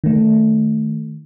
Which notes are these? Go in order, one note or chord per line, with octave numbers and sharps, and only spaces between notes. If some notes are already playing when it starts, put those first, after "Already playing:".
D#3 A3